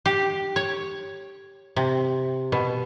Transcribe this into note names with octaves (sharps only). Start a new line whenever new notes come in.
G4
C#5
C3
B2